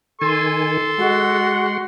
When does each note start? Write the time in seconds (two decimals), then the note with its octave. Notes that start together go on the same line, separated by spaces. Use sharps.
0.21 D#3 A4 G#5 C6
0.98 G#3 F#4 F#5